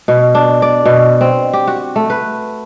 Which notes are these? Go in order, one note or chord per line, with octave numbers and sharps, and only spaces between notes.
B2
D4
D5
B2
C4
G4
F#4
A3
B4